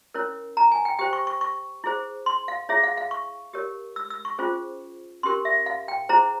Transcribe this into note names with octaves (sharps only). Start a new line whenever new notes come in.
C#4 E4 A#4 C#5
A#5
G#5
G5
G4 C5 G5
C#6
C#6
C#6
E4 G#4 C5
C6
F5
E4 G#4 C#5 E5
F5
F5
C#6
G4 A#4 C#5
E6
E6
C#6
C#4 F4 G#4 C5
C#4 G4 A#4 C6
E5
F5
G5
E4 G#4 C5 A#5